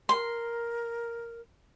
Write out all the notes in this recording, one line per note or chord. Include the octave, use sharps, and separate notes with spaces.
A#4 C6